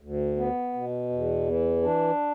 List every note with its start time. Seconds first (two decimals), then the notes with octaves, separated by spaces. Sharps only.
0.01 D2
0.37 B3
0.73 B2
1.10 E2
1.47 E3
1.83 D4